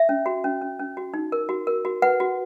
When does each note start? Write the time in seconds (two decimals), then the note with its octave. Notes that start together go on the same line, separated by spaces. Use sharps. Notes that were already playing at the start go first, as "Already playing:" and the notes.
Already playing: E5
0.09 C#4
0.26 F#4
0.44 C#4
0.62 C#4
0.79 C#4
0.97 F#4
1.14 D#4
1.32 A#4
1.49 F#4
1.67 A#4
1.85 F#4
2.02 B4 F#5
2.20 F#4